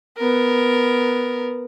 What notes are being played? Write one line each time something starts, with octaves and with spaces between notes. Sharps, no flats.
B3 A#4